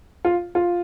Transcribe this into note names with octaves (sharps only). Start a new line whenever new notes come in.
F4
F4